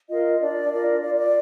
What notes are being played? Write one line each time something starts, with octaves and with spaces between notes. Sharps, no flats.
F4 A#4 D#5
D4 D5
F4 A#4 D5
F4 D5
D5